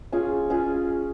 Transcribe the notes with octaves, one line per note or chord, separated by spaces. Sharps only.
C#4 F4 G#4
C#4 F4 G#4